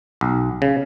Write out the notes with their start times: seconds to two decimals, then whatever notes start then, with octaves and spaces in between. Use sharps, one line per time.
0.21 B1
0.62 C#3